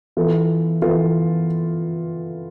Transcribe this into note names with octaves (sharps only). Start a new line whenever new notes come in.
E3 B3 F4 A4
E3 B3 F4 A4